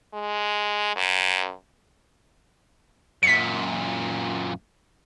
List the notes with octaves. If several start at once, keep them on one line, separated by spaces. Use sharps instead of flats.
G#3
F#2
F#2 A#2 B6 C#7